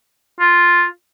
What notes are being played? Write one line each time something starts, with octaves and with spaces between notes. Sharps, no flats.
F4